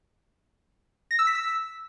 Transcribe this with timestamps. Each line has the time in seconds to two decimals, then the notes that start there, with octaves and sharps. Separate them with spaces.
1.11 A#6
1.19 E6
1.27 B6
1.35 E6